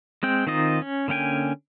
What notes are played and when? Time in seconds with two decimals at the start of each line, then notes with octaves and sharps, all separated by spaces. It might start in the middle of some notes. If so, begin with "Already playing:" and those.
0.23 G#3 C4 G5
0.47 D#3 C4 D#4 F4 D#5
0.82 C#4
1.08 D3 A#3 C#4 G5 G#5